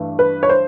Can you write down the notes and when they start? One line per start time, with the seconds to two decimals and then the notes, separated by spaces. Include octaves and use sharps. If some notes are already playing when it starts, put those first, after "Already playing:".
Already playing: G2 E3 A3
0.19 B4
0.43 C#5
0.49 C5